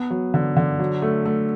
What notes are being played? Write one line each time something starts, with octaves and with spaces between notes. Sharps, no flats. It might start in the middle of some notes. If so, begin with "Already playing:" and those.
Already playing: B3
F#3
D3
D3
F#3
A3
A3